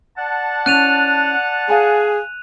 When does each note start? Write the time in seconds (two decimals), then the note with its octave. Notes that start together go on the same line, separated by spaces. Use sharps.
0.17 D5 F#5 A5
0.66 C#4 E4 F#6 D#7 F7
1.68 G#4 F5 G#5 B5